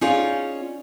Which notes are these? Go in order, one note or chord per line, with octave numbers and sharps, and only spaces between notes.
C#4 D#4 F4 G#4 D5